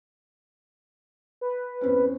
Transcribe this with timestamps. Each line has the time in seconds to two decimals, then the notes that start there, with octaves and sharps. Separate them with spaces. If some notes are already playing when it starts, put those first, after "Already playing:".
1.41 B4
1.81 E2 C4 C#4